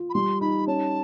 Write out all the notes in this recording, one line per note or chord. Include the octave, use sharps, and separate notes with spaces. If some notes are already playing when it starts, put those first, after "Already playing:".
Already playing: F4
B5
G3 C6
D#4 B5
C#4 A5